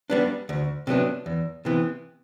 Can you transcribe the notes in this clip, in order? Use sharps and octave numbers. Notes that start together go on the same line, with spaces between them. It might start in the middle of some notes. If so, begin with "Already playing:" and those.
G3 B3 D4
D2
C3 F#3 B3 D4
E2
C3 E3 B3